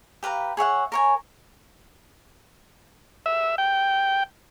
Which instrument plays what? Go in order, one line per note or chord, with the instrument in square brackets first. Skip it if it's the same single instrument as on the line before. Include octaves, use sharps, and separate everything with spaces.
[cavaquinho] G4 B4 F5 A#5
G#4 C#5 E5 F#5
A#4 C#5 G#5
[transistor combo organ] E5
G5